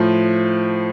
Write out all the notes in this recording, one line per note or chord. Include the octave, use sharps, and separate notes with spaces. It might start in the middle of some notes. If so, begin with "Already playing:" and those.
Already playing: A2 F3